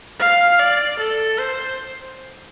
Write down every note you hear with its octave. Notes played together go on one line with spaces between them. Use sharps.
F5
D5
A4
C5